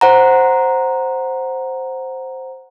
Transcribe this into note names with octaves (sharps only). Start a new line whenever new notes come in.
C5 F#5 A#5